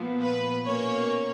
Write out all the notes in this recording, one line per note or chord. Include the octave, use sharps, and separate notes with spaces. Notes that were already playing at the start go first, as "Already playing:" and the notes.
Already playing: A#2 F3 B3
B4
B2 A#3 C#4 C#5